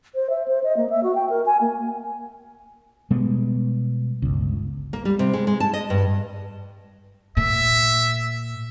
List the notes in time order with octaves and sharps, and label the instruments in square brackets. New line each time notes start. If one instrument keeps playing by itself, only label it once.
[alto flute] C5
E5
C5
D#5
A#3
E5
F#4
G5
A#4
G#5
A#3
[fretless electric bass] B2 G3 G#3 B3
G1 C#2
[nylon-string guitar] A#3
G3
C3
G#3
G#3
A5
D#5
G2
[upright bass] A#2 [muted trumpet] E5